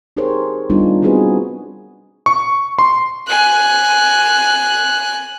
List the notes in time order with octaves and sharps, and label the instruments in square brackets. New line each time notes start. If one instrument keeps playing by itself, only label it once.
[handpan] D#4 G4 G#4 A#4 C5 C#5
G3 A3 B3 D4 D#4 F4
B3 C4 D#4 F#4 G#4 B4
[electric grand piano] C#6
C6
[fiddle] G#5 F#6